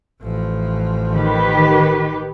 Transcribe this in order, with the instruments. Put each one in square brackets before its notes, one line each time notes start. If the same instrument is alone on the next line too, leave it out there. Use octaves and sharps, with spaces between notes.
[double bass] A1 F3
[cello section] D#3 G4 B4